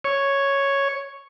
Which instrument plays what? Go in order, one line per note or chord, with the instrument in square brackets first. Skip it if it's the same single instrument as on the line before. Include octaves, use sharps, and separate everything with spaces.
[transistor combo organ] C#5